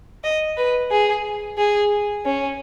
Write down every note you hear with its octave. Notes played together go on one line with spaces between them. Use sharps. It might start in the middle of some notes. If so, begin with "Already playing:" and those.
D#5
B4
G#4
G#4
C#4